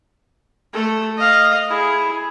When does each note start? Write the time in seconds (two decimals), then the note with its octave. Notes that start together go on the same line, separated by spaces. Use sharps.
0.73 A3 A4
1.17 D#5 F5
1.68 E4 G#4